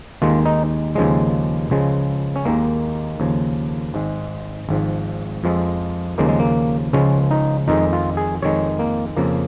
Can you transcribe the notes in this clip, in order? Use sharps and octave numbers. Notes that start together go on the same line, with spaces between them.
D#2 D#3 G#3 F4
D#4
D#2 C#3 F3 G#3
C#2 C#3 F3 G#3
C#4
D#2 D#3 G#3 A#3
D#2 C#3 F3
G#1 G#2 G#3
G#1 G#2 F3
F2 F3 G#3
D#2 C#3 F3 G#3 A#3
G#3
A#3
C#2 C#3 F3 G#3 C#4
D#4
F2 D#3 G#3 D#4
F4
G#4
F2 D#3 G#3 C#5
A#3
F2 C#3 F3 A#3